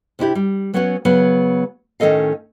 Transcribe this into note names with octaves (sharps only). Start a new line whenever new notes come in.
C3 D4 E4 G4
G3
F#3 B3 C#4 F#4 F#5
C#3 F#3 B3
A2 D#3 C#4 A4 D#5 F5